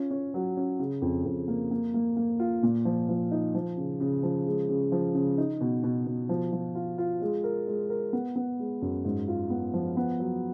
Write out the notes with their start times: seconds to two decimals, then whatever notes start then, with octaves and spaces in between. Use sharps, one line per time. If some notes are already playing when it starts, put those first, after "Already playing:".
Already playing: C#4 F4
0.11 C#4
0.34 F#3
0.57 C#4
0.79 C#3
1.02 F2
1.25 F2
1.48 A#3
1.71 A#3
1.94 A#3
2.17 A#3
2.39 F4
2.63 A#2
2.85 F3
3.09 F3
3.31 D#4
3.55 F3
3.77 C#3
4.00 C#3
4.23 F3
4.46 G#3
4.69 C#3
4.92 F3
5.15 C#3
5.38 D#4
5.61 B2
5.84 B2
6.06 B2
6.29 F3
6.52 F3
6.75 F4
6.98 F4
7.21 G#3
7.44 A#4
7.67 G#3
7.90 A#4
8.13 B3
8.36 B3
8.59 G#3
8.82 F#2
9.05 G#2
9.28 F4
9.50 B3
9.74 F3
9.97 B3
10.20 F#3